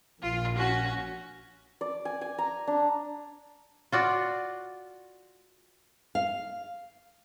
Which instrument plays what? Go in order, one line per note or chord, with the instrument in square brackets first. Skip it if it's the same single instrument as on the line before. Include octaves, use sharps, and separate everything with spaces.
[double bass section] A#1 A#2 [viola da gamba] F4
[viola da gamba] C#4 F#4
[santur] D5
G#5
G#5
A#5
D4
[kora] F4 F#4 D5
[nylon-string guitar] F5